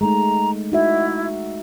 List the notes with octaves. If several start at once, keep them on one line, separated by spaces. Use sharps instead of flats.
G#3 A3 D#4 A#5
D#4 E4 F#4 E5